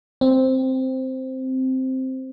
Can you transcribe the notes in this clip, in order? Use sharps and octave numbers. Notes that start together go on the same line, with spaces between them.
C4